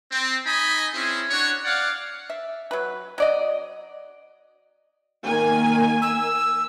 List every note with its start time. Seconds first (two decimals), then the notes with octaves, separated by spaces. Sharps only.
0.12 C4
0.46 D#4 D#5 G#5 B5
0.94 C4 C#4 E4 G#4
1.30 D4 F#4 C#5
1.65 D5 F5 F#5
2.30 E5
2.71 F#3 B4
3.18 F#3 D5 D#5
5.27 D#3 A#3 G#5
6.02 E6